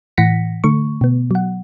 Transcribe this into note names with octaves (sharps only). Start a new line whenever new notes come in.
A2 E3 F#5 A#6 B6 C#7
D3 A3 C#6
B2 B3
F#3 F#5